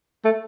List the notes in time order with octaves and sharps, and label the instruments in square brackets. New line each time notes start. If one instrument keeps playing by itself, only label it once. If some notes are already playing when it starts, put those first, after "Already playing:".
[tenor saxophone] A3